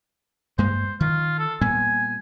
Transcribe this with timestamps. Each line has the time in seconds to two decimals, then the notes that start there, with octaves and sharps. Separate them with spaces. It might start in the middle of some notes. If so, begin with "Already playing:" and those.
0.58 G2 G#3 A#3 C5
1.00 D#3 F4
1.39 A4
1.61 A#2 G3 B3 G#5